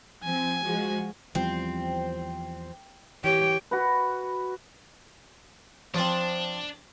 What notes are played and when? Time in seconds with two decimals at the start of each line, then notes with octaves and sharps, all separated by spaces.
0.24 F3 C4 G#5
0.63 F3 G#3 F#4
1.35 E2 F3 G3 C4
3.24 E3 G4 C#5 G5
3.71 F#4 B4
5.94 F3 C4 D4